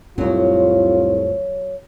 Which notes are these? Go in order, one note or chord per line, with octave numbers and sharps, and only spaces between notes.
C2 F2 A2 F#3 F4